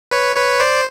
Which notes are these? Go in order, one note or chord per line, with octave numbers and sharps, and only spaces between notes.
B4 C#5
B4 C#5
C5 D5